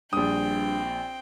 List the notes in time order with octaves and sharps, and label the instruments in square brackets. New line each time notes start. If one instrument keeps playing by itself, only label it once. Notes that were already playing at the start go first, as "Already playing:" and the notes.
[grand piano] A#1 D#6 [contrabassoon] G2 [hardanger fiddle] C4 G5